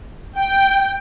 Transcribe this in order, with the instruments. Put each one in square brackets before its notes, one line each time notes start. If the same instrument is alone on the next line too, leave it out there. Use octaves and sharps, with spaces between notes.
[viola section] G5